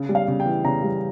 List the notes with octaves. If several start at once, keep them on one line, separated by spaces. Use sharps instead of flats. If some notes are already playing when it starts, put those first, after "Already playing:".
Already playing: C#3
G3
F5
C#3
G5
E3
C#3 A#5
G3